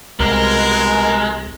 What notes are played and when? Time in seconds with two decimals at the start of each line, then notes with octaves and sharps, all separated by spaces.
0.20 C2 B2 G#3 A#4